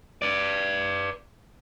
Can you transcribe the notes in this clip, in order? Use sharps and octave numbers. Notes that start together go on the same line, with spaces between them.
B4 D5